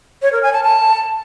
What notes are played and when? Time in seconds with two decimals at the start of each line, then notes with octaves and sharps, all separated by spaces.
0.22 C#5
0.33 A#4
0.43 G#5
0.53 A5
0.64 A5